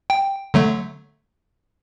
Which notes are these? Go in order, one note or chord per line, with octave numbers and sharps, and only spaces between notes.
G5
D3 F#3 A3